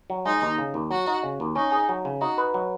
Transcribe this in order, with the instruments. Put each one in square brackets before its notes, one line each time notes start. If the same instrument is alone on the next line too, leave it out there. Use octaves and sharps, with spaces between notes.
[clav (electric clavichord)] F#3
[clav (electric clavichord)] G#3 [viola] D#4
[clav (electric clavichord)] D#2
C#3
D#2
[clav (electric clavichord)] F#3 [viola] F#4
[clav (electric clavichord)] D#4
C#3
D#2
[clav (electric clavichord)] C#4 [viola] D#4
[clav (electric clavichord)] G#4
F#3
C#3
[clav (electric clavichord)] D#4 [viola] F#4
[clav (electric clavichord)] B4
F#3